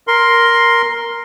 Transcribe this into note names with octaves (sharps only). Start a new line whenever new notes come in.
A#4 C6